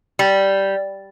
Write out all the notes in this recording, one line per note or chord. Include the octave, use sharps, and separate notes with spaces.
G3